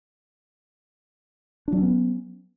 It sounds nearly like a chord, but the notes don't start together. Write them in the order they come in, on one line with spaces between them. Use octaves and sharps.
D4 F#3 C#4 B3